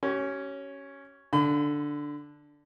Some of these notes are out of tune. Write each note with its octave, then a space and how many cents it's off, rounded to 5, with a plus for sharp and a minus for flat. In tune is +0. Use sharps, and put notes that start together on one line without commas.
C#4 +0 G4 -40
D3 +0 B5 +40